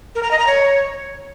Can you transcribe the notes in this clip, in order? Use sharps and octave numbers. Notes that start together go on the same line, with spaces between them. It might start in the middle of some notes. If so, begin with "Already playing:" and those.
A#4
A#5
D#5
A#5
C#5